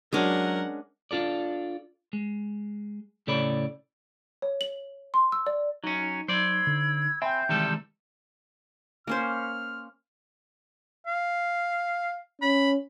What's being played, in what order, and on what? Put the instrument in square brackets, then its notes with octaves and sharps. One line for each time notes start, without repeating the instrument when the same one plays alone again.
[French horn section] F#3 [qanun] G#3 C#4 D4 [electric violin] A#4 F#5
[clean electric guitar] D4 F4 A4 D5
G#3
A2 C#3 A4 C#5 D5 B5
[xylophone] C#5
F#7
C6
E6
D5
[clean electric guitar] F#3 C#4 [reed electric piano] D#4
[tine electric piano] F#3 [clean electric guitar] C5 D5 [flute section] B5 E6 G#6
[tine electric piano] D3
[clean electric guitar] C4 [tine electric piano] E5 G5 [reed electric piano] G#5 B5 [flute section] G6
[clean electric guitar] C3 G3 A4 [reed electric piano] D#3 E3 G#3
[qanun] A#3 C#4 C5 [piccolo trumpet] F6
[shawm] F5
[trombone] C#4 [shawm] B5